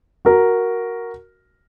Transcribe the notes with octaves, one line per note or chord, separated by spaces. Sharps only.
F#4 A#4